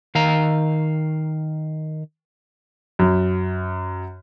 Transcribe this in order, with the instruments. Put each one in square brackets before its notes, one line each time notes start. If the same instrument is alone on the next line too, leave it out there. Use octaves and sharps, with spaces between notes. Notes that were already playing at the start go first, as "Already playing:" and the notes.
[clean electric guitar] D#3 F5 A#5
[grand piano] F#2